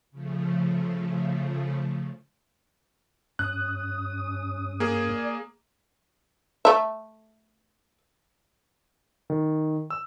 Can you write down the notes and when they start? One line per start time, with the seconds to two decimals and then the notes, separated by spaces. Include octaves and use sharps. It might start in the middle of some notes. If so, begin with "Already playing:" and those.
0.11 C#3 F3 A3
3.39 G2 C#4 D#6 F#6
4.80 A#3 G#4
5.13 D5
6.65 A3 E5
9.30 D#3
9.90 E6